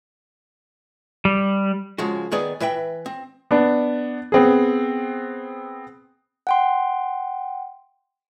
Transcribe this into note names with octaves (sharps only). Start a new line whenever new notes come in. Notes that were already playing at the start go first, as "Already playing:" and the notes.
G3
C#3 F3 G#3 F#4
D#3 B3 G#4 D5
E3 B4 E5 G5
C4
B3 D4
B3 C4 G#4
F#5 G5 C6